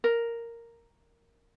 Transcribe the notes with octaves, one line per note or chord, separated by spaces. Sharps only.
A#4